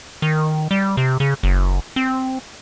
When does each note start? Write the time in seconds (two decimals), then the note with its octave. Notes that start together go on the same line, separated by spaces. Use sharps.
0.22 D#3
0.71 G3
0.97 C3
1.20 C#3
1.43 F#1
1.96 C4